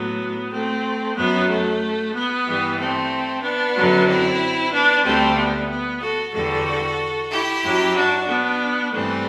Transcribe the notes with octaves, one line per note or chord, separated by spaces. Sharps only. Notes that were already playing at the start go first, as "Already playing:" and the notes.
Already playing: A2 F#3 B3
A3 C4
F#2 F#3 B3
A3
B3
G2 E3 G3
A3 C4
B3 D4
F#2 D3 F#3
C4 E4
B3 D4
D2 D3 G3 A3 C4
B3
B3
F#4 A4
E2 D3 G3 F#4 A4
E4 G4
F#2 F#3
D4 F#4
B3 D4
G2 E3 G3 A3 C4